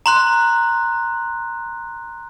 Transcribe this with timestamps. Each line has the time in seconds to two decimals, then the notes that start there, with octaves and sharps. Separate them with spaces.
0.06 A#5 C6 F#6